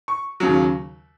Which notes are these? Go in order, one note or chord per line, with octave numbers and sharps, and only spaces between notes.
C#6
D#2 C#3 F#3